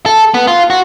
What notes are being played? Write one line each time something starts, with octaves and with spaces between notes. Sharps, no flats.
A4
B3
F4
F#4